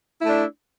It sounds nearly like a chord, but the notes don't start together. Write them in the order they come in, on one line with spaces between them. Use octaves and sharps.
E4 A3 D4